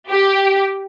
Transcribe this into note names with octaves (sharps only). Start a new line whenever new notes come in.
G4